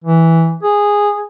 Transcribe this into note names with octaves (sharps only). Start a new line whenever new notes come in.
E3
G#4